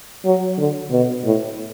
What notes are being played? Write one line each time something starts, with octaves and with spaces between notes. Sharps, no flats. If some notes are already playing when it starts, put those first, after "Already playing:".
F#3
D3
B2
A2